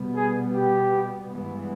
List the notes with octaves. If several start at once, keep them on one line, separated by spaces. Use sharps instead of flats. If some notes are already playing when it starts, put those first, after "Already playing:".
Already playing: B2 G3 B3
G#4
G4
G2 E3 G#3 B3